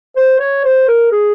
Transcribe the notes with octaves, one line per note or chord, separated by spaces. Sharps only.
C5
C#5
C5
A#4
G#4